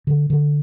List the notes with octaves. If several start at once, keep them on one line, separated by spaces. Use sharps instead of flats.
D3
D3